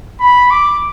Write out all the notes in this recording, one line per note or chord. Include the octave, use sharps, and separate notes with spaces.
B5
D6